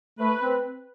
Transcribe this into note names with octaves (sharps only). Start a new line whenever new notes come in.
A3 B4
C4